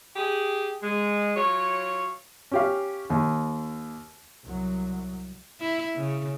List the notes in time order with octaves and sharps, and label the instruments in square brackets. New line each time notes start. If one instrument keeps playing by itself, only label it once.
[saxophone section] G4 G#4
G#3
F#3 F4 C#5
[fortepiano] C#4 G4 F5
D#2
[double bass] C2 F#3
[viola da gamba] E4
C#3